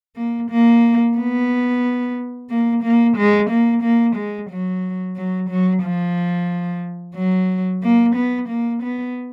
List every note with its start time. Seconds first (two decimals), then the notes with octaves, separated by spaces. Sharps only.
0.16 A#3
0.50 A#3
1.16 B3
2.50 A#3
2.83 A#3
3.16 G#3
3.50 A#3
3.82 A#3
4.15 G#3
4.50 F#3
5.16 F#3
5.49 F#3
5.83 F3
7.15 F#3
7.82 A#3
8.15 B3
8.48 A#3
8.82 B3